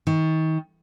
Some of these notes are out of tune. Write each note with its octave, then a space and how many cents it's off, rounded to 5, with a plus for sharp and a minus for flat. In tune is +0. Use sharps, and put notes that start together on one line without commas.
D#3 +35